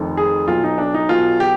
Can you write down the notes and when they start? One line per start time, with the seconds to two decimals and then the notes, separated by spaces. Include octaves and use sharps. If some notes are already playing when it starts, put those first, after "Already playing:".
Already playing: F1 F2 D#3
0.17 G#4
0.48 B1 B2 F4
0.64 D#4
0.78 D4
0.94 D#4
1.09 B1 B2 F4
1.40 G4